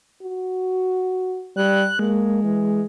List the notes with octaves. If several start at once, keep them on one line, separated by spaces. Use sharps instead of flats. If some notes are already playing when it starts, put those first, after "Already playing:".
F#4
G3 F#6
G#3 A#3
E3